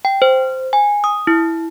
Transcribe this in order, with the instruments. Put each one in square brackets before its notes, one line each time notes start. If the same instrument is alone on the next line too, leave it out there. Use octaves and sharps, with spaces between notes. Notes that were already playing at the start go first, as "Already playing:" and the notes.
[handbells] G5
C5
G#5
D#6
E4